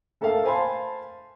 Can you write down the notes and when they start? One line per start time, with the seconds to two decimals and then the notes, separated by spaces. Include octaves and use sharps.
0.21 A3 A4 A#4 E5 F5 A5
0.44 C5 F5 G#5 A5 B5 C6